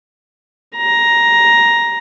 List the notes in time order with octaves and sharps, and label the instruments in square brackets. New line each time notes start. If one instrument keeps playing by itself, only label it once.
[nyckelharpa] A#5